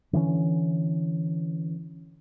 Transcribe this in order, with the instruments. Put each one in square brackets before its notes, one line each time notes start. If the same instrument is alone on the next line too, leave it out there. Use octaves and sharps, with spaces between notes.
[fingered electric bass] D3 E3 G3 C#4